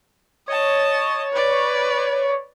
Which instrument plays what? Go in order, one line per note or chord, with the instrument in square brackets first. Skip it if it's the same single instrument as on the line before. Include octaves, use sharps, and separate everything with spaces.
[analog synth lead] C#5 [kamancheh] D#5 A5
[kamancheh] B4 D5